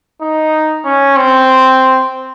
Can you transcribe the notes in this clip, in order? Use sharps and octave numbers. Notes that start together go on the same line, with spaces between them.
D#4
C#4
C4